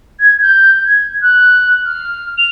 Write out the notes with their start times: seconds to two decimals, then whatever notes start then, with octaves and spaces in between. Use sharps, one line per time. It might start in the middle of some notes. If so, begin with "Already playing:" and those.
0.19 G#6
0.42 G6
0.85 G#6
1.22 F#6
1.85 F6
2.38 F7